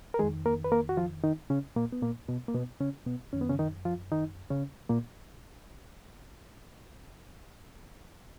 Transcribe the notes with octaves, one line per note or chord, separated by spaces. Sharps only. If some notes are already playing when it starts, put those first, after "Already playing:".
A#4
F2 D#3 G#3 G#4
A#3 A#4
B4
A#3 A#4
F#4
F3 F4
D#3 D#4
C#3 C#4
A#2 A#3
B3
A#2 A#3
B2 B3
A#3
B2 B3
C#3 C#4
B2 B3
F#2 D#3 C#4
B3
C#3 C#4
D#3 D#4
F3 F4
D#3 D#4
C#3 C#4
A#2 A#3